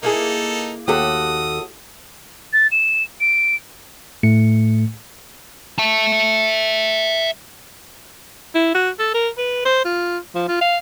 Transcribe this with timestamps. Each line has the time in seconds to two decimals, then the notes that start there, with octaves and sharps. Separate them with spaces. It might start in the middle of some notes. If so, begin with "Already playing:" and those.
0.03 A#3 D#4 E4 G#4 A4
0.88 D#2 F#4 G4 A4 D#6
2.53 A6
2.72 E7
3.20 D7
4.23 A2 A3 C#7
5.79 E5 A5
8.55 E4
8.75 F#4
8.99 A4
9.14 A#4
9.38 B4
9.65 C5
9.85 F4
10.35 F3
10.48 F4
10.61 F5